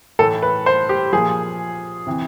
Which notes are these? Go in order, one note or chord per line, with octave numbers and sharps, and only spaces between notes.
A2 E3 A4
B4
C5
G4
A#2 F3 G#4
C3 E3